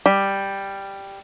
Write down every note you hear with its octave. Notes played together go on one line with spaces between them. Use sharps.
G3